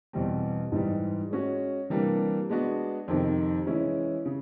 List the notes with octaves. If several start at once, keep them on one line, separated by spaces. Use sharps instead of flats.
E2 B2 G3 C4
G#2 E3 G3
G#3 C#4 F#4
C3 E3 G3 A#3 D4
G#3 B3 D4 F#4
F2 C3 D#3
E3 G#3 C#4 E4
C#3